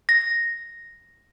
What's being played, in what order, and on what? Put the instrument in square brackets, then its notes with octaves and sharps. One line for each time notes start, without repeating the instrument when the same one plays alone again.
[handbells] A#6